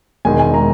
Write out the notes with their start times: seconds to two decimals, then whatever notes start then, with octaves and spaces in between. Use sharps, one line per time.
0.25 E1 E2 D#3 G#3 G#5
0.39 G#5
0.54 A#5